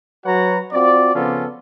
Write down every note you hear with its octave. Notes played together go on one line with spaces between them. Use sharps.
F#3 F#4 B4 C#5 F#5 A#5
C4 F4 F#4 D5
C#3 F3 B3 C#4 F4 A4